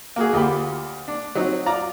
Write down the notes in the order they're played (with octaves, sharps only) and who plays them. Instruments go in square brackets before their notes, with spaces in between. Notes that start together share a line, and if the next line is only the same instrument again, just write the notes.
[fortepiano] A#3 F#4 G#4
D2 F4 G4 B5
D4
F#3 C4 D#4
F4 D5 A#5